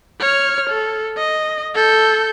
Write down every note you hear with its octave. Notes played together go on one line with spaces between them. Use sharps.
C#5 F6
A4
D#5
A4 G6